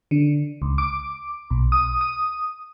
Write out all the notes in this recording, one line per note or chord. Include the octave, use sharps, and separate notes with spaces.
D3
C#2
D6
B1
D#6
D#6